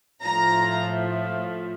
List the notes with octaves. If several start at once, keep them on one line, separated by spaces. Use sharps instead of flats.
A2 F3 A3 A#5